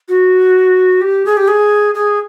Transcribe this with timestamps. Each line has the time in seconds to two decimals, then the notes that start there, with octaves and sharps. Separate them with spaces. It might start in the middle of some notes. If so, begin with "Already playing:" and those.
0.09 F#4
1.01 G4
1.26 G#4
1.37 G4
1.48 G#4
1.95 G#4